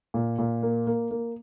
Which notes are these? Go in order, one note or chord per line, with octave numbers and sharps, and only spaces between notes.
A#2
A#2
A#3
A#3
A#3